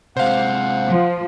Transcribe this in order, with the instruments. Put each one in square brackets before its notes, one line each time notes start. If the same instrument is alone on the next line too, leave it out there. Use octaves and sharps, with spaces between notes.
[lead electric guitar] C3 G#3 [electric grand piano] C5 F5 [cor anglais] F#5
[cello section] F3